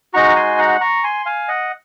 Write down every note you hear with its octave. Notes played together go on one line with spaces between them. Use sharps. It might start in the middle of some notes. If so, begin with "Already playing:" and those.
G#3 D#4 F#4 A#5 C#6
G#5 C6
F#5 A#5
A#5 C#6
G#5 C6
F5 G#5
D#5 F#5